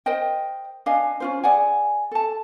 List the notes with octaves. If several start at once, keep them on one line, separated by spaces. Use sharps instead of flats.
A#4 C5 D#5 G5
D4 D#5 F5 G#5
C#4 F4 C5
G#4 D5 F#5 G#5
A4 A5